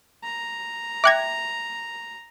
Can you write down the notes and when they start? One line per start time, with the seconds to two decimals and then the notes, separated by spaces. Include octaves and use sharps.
0.24 A#5
1.04 E5 G5 D6 F#6 G#6 A#6